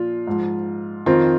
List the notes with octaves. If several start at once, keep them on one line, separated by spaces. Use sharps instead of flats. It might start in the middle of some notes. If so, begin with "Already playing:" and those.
Already playing: A#2 F3 F4
G#2 F3
F2 D#3 C4 F4